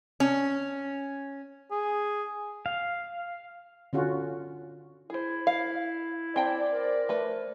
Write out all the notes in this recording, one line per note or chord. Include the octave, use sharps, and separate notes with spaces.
C#4
G#4
F5
D3 C#4 F4 F#4
E4 G#4 C5
F5
C4 C5 D5 G5 A5
A#4
A3 B4